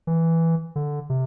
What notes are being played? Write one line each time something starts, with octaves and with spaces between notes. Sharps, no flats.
E3
D3
C3